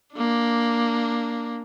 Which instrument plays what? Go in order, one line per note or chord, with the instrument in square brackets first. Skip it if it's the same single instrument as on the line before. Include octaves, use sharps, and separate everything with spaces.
[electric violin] A#3 D4